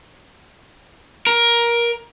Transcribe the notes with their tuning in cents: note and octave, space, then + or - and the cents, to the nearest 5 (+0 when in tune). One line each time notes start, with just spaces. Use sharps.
A#4 +15